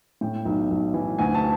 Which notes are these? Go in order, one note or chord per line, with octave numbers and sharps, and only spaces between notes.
A2 G5
B1
B1
E3
D2 G#5
A5